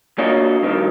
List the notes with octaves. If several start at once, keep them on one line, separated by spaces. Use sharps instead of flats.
A#3 D4 F4 F#4 C#5 D#5
G2 B2 D#3 F3